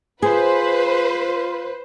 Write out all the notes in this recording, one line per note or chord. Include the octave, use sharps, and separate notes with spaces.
F4 G#4 B4 C5